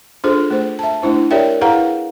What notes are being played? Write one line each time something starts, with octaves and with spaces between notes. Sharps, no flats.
D4 F4 G#4 A4 C5
A3 C5
E5 A5
A3 D4 E4 C5
G4 A#4 C#5 D5 E5 G5
E4 G#4 B4 F5 F#5 A#5